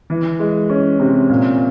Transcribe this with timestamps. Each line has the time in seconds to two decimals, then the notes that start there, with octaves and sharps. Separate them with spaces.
0.10 E3
0.39 G#3
0.70 C#4
1.00 C3
1.30 A#2